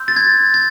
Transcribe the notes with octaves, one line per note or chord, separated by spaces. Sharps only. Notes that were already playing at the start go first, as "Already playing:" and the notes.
Already playing: C6 E6 G6
A6
G#6
G#6